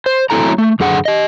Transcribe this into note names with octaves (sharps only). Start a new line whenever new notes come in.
C5
F#3 A3 C4 E4 A4 A#5
A3
F#2 D3 G#4 F#5
G4 D#5